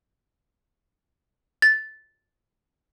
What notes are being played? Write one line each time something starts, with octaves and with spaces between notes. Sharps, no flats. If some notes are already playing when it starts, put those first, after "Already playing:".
A6